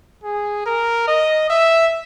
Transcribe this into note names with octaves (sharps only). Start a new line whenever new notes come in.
G#4
A#4
D#5
E5